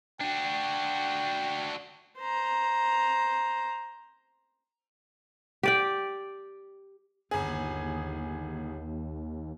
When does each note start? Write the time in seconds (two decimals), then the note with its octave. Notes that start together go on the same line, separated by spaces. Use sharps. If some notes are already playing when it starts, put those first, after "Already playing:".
0.21 D4 F#4 G5
2.20 C5 A#5
5.63 G4 D5 G5
7.31 G1 D#2 G#4